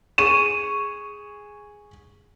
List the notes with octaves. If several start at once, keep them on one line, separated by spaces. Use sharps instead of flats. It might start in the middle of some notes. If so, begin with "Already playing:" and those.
G#4 C#6 D#7 E7